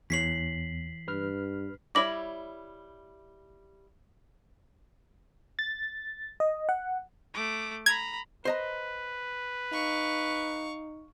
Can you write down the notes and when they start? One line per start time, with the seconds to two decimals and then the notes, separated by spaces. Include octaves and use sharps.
0.10 E2 E3 C#5 B6 C7 F#7
1.08 G2 B4 F6
1.95 G3 E4 C#5 D6 A#6 F#7
5.59 A6
6.40 D#5
6.69 F#5
7.34 A3 D6
7.86 A#5 B5 G#6
8.45 B4 C5 D#5 A#5
9.72 D#4 F5 C#6